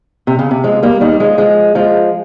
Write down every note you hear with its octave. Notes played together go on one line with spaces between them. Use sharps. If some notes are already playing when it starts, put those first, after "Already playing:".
C3
C#3
C3
F3 G#3
G3 A#3
D#3 G3
F3 G#3
F3 G#3
F3 G#3